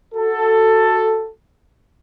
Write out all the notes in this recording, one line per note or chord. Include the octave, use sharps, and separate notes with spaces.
F#4 A4